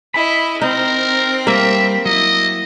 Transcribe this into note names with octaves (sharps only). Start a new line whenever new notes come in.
E4 D#5 B5
C4 D#4 A#4
G3 A#3 E5
F#3 E4 D#5